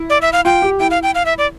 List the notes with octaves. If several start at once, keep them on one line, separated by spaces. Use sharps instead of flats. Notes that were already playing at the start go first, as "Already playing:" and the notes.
Already playing: E4
D5
E5
F5
F4 G5
G4
E4 G5
F5
G5
F5
E5
D5